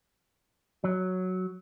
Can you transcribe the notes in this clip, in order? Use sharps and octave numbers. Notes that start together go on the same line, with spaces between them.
F#3